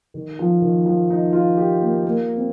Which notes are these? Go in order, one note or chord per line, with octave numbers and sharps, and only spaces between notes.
D#3
F3
D#3
F3
D#4
F4
G4
A#3
A#3
C4